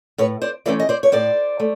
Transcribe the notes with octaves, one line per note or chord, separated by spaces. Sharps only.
A2 B4 C#5
C5 D5
E3 A3 C#4 C5 D5
D#5
C5 D5
C#5
A2 C5 D5
A3